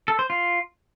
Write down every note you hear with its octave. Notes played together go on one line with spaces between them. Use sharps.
A4
C5
F4